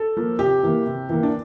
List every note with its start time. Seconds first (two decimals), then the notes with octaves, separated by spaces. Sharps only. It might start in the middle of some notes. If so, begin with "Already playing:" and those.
Already playing: A4
0.17 F3 A#3
0.39 C3 G4
0.63 E3 A#3
0.87 C3
1.09 E3 A#3
1.23 D4